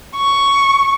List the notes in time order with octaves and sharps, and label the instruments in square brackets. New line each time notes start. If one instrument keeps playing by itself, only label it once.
[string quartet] C#6